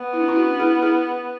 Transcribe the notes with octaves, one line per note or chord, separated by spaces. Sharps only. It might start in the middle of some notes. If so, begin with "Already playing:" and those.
Already playing: B3
E4
D4
C#4 E4
D4 F#4
E4 G#4
E4 G#4